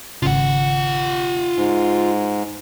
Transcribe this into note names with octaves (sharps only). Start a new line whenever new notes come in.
G#1 C#3 F4 F#5
G#2